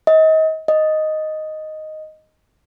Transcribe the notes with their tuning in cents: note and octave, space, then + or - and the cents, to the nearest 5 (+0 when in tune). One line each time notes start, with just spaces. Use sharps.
D#5 +30
D#5 +0